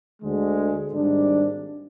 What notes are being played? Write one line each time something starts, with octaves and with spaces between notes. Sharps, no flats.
D2 D3 G#3
G#1 G#2 G3 D4